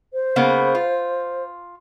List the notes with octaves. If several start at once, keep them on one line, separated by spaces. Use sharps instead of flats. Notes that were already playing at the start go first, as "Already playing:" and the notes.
C5
C#3 A#3 B3
F4